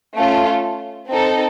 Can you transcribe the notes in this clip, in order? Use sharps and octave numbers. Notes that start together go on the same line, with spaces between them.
A3 C#4 F4 A4
C4 D#4 A4